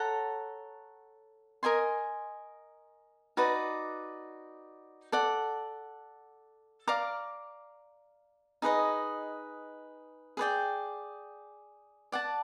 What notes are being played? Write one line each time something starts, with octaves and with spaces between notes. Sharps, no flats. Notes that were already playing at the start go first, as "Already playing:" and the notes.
Already playing: A4 C#5 F#5 A#5
A#4 D#5 G#5 C6
D#4 F#4 B4 D5
A4 D5 F#5
D5 F5 A#5 D6
D#4 G#4 B4 D#5
G#4 B4 D5 G5
D5 F#5 A5